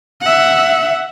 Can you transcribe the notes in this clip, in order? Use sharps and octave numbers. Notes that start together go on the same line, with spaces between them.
E5 F#5